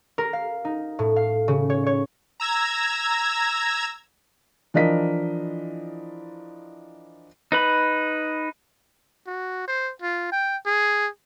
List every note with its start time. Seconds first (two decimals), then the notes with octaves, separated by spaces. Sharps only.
0.18 A#4
0.33 F5
0.65 D#4
0.99 A2
1.16 F5
1.48 C#3
1.70 C#5
1.86 C#5
2.40 A#5 E6 G#6 A#6
4.74 E3 F3 D4 A#4 D#5 B6
7.52 D#4 B4 B5
9.27 F#4
9.68 C5
10.02 F4
10.32 G5
10.66 G#4